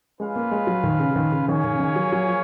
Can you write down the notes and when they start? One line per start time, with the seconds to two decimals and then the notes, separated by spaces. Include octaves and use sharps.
0.20 G#3 C#4 F4 B4 F5
0.36 A#3
0.51 G#3
0.67 F#3
0.84 D#3
0.99 C#3
1.11 C#3
1.16 D#3
1.32 C#3
1.48 D#3 A#3 C#4 G#4 C#5
1.64 D#3
1.73 C#3
1.79 D#3
1.96 F#3
2.12 F#3
2.26 F3